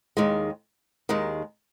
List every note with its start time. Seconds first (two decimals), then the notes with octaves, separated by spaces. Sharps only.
0.17 D#2 D#3 G#3
1.09 D#2 D#3 G#3